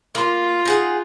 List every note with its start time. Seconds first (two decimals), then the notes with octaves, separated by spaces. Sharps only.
0.15 A#3 F4 F5
0.65 D#4 G#4 F#5